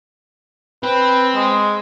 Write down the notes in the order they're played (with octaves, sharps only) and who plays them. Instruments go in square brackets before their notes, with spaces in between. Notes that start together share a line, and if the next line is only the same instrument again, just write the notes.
[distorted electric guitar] C4 [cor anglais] B4
[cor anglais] G#3